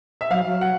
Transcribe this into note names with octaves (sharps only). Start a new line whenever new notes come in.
E5
F#3 F5
F#3
F#5